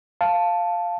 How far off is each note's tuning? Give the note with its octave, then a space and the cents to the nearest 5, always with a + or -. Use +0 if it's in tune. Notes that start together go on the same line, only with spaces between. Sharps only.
F5 +0 A5 +0